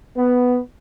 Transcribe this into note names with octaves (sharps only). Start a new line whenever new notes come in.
B3